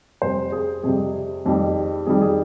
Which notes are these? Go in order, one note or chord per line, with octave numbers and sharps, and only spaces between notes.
F2 C3 G3 C5
G#4
F2 C3 G3 G#4
F1 F2 D#3 G3
F1 F2 D#3 G3 G#4
G#4